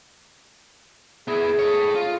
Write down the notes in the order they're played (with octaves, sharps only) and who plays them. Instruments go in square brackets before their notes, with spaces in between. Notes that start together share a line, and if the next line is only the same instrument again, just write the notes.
[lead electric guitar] B3 E4 [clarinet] G#4
[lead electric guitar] A4 C#5
F4